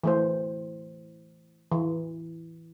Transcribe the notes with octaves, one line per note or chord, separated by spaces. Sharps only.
E3 A3 C5
E3